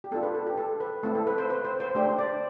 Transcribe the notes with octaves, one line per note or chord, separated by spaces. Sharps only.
G4
B3 D4 F4 A4
B4
A4
G4
A4
B4
A3 C4 E4 A4
A4
B4
C5
B4
C5
C5
A3 D4 G4 C5
D5